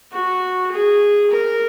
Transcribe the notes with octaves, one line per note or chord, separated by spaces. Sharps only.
F#4
G#4
A#4